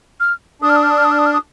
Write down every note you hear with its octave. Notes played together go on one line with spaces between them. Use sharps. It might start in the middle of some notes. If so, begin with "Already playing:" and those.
F6
D4 D#6
F6
D#6
F6
D#6
F6
D#6
F6
D#6
F6
D#6